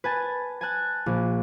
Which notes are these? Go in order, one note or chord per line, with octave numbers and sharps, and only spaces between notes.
B4 G#5 A5 A6
G#5 A5 F#6
A#1